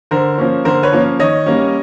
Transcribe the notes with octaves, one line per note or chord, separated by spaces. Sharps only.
D3 A#4 C5
F3 A#3 C#4
D3 A#4 C5
B4 C#5
F3 A#3 C#4
D#3 C#5 D#5
G3 A#3 C#4